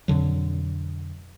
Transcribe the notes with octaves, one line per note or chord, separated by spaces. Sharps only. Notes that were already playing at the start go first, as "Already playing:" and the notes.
F2 B2 D3 F#3